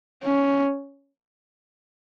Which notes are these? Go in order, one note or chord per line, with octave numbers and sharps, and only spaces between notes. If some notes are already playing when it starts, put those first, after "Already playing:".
C#4